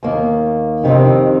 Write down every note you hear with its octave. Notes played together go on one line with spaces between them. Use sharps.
D#2 D#3 A#3
F2 C3 D#3 C4 D#4